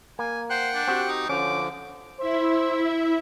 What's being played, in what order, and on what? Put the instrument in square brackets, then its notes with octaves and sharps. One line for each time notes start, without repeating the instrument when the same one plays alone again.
[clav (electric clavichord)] A#3 [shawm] G#5
[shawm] C5 [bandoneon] F#5 G5 F#6
[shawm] D4
[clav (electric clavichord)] C4 F#4 G4
[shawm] D#4
[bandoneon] D3 F3 [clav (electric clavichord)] C#4 [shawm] D6
[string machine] E4 E5 [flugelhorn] C5